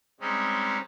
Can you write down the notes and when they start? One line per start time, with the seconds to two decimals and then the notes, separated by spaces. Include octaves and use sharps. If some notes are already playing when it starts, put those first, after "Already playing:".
0.20 G3 G#3 C4 C#4 D#4